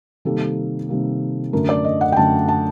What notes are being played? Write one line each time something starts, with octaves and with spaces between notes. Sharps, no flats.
C3 D#3 G3 A#3 A4
C3 D#3 G3 A#3
F#2 D3 A3 A#4
D5
D#5
F#5
G5
F#2 D3 A3 A5
A5